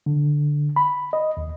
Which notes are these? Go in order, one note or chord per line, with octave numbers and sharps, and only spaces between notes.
D3
B5
D#5
D#2